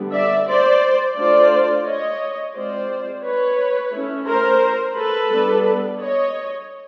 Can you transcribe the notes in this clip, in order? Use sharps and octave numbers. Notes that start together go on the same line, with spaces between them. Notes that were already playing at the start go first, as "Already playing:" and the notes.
Already playing: D3 G3 B3 D4
D5 E5
C5 D5
A3 D4 F4 C5 D5
C#5 D#5
G#3 C4 F4 C5 D5
B4 C#5
A3 C#4 E4
A#4 C5
A4 B4
G3 B3 D4
C#5 D#5